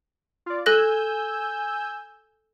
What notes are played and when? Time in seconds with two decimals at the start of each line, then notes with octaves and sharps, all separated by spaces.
0.46 F4 D5
0.66 A4 G#5 E6 F#6 G6 A#6